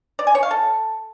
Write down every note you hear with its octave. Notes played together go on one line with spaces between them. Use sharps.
D5
G#5
C#5
F5
A4